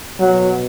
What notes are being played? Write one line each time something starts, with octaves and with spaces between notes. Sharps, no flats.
B2 F#3